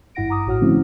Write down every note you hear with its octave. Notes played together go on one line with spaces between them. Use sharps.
G#1 G2 E4 F#5 A#6 D7
F#5 A#5 D6 D#6
A1 A2 F#4 C#5 F#5 F6
D3 F3 A3 C4 C#4 E4